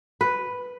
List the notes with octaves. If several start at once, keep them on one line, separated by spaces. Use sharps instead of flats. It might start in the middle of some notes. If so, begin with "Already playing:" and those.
B4